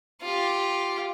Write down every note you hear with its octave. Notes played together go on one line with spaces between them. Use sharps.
F4 G4